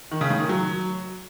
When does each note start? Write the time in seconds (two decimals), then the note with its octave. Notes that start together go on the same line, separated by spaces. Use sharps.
0.11 D#3
0.21 C#3
0.30 A2
0.40 D#3
0.49 F#3